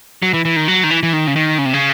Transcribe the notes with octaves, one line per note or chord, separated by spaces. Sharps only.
F#3
E3
E3
D#3
F#3
D#3
E3
E3
D#3
C#3
D#3
C#3
C3
C#3